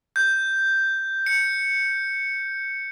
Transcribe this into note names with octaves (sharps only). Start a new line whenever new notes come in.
G6
C#7